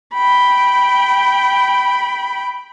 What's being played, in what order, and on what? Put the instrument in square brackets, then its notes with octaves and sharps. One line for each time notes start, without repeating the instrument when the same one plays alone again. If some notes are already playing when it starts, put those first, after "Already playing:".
[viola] G5 B5